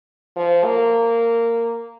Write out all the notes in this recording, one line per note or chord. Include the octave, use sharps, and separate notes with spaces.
F3
A#3